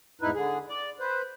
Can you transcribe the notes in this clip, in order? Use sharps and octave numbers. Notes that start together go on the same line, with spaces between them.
E2 G#2 D#4 E4 B4
D3 G#4
D5
B4 C5